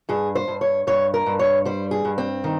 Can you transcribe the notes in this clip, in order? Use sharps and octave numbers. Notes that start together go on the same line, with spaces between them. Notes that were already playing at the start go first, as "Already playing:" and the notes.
G2 G#4
C5
G2
C#5
G2 C#5
A#4
G2
C#5
G3 C5
G#4
G2
C4
D#3